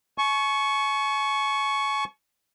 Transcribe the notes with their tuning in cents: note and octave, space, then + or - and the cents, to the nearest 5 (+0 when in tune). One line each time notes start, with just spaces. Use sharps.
G#5 +45 C#6 +0